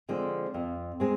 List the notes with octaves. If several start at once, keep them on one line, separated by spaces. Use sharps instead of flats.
D3 F3 G#3 C4
F2
G#3 C4